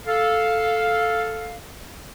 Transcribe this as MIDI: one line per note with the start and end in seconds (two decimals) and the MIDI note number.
0.06 1.57 69
0.06 1.57 77